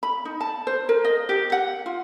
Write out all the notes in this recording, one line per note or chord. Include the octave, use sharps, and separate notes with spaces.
B5
D#4
A5
C5
A#4
D#5
G4
F#5
F4